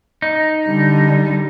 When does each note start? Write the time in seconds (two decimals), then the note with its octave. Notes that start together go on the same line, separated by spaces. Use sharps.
0.22 D#4
0.66 D3 G3